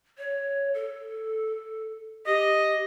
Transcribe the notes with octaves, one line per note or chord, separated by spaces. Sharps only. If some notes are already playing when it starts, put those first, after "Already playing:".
C#5
A4
G4 D#5